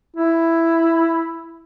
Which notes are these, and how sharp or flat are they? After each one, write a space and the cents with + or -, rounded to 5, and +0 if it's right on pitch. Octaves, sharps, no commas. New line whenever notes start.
E4 +5